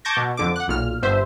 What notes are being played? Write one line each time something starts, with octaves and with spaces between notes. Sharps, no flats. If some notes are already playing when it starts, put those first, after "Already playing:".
A5 C#6 D6 G6 G#6 A#6
B2
F2 D3 D6
F#5 F#6
B1 A#2 F6
G1 G2 C5 E5